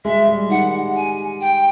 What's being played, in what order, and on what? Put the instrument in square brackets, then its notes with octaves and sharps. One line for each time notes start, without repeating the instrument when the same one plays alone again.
[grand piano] G#3 [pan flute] E5
[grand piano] G3
[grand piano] D#3 [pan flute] F#5
[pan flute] G#5
G5